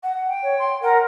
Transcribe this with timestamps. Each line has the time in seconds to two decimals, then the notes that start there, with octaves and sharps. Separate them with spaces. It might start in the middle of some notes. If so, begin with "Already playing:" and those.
0.03 F#5
0.27 G5
0.43 C#5
0.59 C6
0.82 A#4 F#5